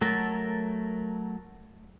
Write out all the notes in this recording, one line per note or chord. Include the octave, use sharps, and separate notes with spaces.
F#3 A3 A4 A#4 A5